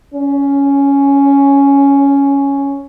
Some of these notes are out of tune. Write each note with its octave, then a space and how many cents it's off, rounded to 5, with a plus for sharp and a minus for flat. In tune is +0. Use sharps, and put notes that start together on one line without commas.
C#4 +5